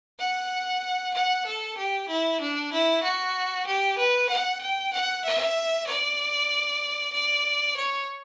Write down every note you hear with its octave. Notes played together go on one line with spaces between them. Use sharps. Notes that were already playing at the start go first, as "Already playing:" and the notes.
F#5
F#5
A4
G4
E4
D4
E4
F#4
G4
B4
F#5
G5
F#5
E5
D5
D5
C#5